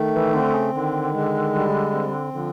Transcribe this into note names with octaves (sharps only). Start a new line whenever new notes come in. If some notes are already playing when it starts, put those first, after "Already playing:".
Already playing: D#3 A3
E3
D3 C4
C#3
D3 D#3
G#3
G3
C4
D3 F3